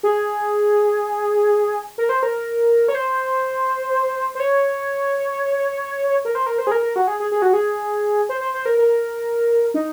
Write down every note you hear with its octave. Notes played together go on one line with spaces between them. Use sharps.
G#4
A#4
C5
A#4
C#5
C5
C5
C#5
A#4
C5
A#4
C5
G#4
A#4
A#4
F#4
G#4
G#4
G#4
F#4
G#4
C5
C5
C5
A#4
A#4
D#4